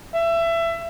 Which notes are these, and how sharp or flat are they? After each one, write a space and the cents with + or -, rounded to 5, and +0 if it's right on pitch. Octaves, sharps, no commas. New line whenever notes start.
E5 +25